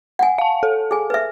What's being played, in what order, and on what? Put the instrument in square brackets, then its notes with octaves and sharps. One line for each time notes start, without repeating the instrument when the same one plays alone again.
[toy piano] F#5 G#5
[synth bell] F5 A5
A4
[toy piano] G#4 G#5
B4 E5